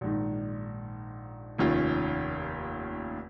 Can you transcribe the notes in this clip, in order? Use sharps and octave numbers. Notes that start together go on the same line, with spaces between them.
A#1 G#2 D#3
F1 D#2 D#3 C#4 F4